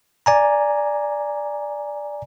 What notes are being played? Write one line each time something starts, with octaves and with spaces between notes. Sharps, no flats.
D5 G#5 A#5